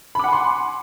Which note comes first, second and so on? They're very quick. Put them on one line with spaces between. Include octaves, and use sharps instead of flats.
B5 D6 F#5 G#5 C6